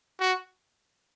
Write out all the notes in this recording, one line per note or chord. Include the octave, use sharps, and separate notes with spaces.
F#4